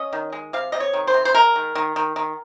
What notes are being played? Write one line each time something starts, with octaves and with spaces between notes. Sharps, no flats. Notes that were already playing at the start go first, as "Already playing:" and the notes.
Already playing: C#4 D#5
D#3
G#3
C3 F5
C3 D#5
C#5
D#3
C5
C3
C5
G#3 A#4
D#3
D#3
D#3
D#3